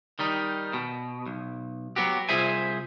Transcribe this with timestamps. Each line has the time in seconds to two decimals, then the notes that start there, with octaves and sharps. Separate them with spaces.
0.19 D#3 G3 D#4
0.73 B2
1.26 B1
1.96 F#3 A#3 B3 F#4 G4
2.29 C2 F4 G#4 C5 E5 G#5